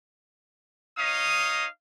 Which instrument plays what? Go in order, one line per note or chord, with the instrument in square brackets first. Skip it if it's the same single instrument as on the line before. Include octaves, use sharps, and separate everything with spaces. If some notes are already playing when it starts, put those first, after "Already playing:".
[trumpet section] D#4 C#5 D#5 F5 D#6